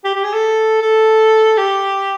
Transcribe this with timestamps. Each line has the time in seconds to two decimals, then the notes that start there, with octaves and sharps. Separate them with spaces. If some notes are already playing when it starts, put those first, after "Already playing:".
0.04 G4
0.15 G4
0.24 G#4
0.33 A4
0.81 A4
1.58 G4